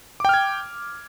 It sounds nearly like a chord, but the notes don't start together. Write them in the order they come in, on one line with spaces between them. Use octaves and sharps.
D6 G5 F6 G#6